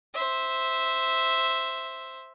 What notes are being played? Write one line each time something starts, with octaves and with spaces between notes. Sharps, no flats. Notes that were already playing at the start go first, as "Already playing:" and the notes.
C5 E5